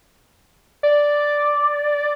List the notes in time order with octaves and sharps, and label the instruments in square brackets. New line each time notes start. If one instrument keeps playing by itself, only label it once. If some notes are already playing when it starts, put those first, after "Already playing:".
[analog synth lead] D5